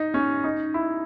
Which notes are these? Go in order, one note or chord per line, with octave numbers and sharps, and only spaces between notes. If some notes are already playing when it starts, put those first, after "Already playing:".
Already playing: D#4
C#4
D#4
E4